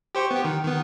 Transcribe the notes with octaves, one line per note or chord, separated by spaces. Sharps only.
G4 C5 C#6
B3 G4
D#3
D#3 B3